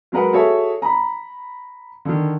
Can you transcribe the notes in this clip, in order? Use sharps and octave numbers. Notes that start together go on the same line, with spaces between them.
F#3 G#3 A#4 B4 F#5
F#4 G#4 A4 C#5 E5
A#5 B5
D3 D#3